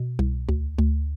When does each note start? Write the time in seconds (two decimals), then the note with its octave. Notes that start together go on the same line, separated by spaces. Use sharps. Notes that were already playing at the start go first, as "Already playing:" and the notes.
Already playing: B2
0.19 C2
0.49 D2
0.79 D2